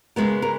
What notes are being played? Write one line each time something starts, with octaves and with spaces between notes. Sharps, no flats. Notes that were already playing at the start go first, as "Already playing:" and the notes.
C#3 G#3 B3 A#4
A#4